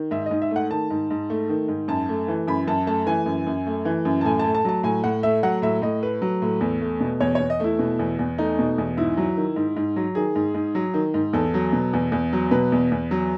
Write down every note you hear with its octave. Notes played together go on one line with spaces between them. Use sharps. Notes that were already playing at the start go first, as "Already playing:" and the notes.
Already playing: D#3
G#2 E5
G#2 D#5
E5
A3 F#5
D#3 A5
G#2
G#2
A3
D#3
G#2
F#2 A5
A3
E3
F#2 B5
F#2 A5
A3 A5
E3 G#5
F#2
F#2
A3
E3
F#2
A5
A2 G#5
A3 A5
A5
F#3 A5
A2 G#5
A2 F#5
A3 E5
F#3 F#5
A2 E5
A2 D#5
A3 B4
F#3
A2
E2
A3
B2
E2 C#5
E2 C#5
D#5
A3 E4
B2
E2
E2
A3 D#4
B2
E2
G#2 E4
F#3
D#3
G#2
G#2
F#3
D#3 G#4
G#2
G#2
F#3
D#3
G#2
E2 A4
F#3
B2
E2
E2
F#3
B2 B4
E2
E2
F#3